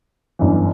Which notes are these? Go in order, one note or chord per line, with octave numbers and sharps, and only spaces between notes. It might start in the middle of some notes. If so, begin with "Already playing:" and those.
G1 F#2 E3